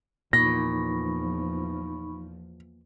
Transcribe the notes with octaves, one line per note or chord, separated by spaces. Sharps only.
E2 A#2 F3 D#4 B5 C#6 A#6